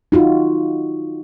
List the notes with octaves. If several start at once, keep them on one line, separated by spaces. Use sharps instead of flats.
D#4 F4 F#4